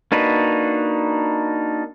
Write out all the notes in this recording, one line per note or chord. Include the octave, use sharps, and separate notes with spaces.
A#3 D4 D#4 F#4 B4